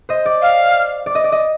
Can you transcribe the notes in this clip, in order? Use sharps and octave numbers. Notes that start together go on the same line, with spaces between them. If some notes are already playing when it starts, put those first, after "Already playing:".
C5 D#5
D5
F5
D5
D#5
D5
D#5